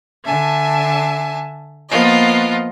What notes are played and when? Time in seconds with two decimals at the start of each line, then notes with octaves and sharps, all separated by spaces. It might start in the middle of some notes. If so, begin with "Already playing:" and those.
0.25 D3 E5 G#5 A5
1.89 F3 A#3 B3 F4 D#5